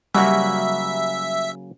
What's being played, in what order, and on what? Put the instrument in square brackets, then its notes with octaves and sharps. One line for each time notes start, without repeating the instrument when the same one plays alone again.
[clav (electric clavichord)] C#3 F#3 A#3 [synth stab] G3 [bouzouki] F#4 F#5 [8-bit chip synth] E5